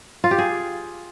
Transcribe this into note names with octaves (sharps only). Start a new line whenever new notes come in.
F4
G4
G#4